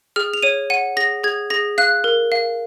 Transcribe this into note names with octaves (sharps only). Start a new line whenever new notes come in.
G#4 F6
F7
C#5 D#7
F#5 D#7
G#4 A#6
G#4 G#6
G#4 A#6
F5 F#6
A#4
F5